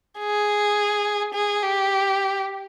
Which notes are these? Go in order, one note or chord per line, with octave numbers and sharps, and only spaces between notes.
G#4
G#4
G4